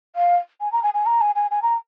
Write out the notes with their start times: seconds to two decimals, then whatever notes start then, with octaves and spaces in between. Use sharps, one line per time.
0.16 F5
0.61 G#5
0.72 A#5
0.83 G#5
0.94 G#5
1.06 A#5
1.21 G#5
1.35 G#5
1.51 G#5
1.62 A#5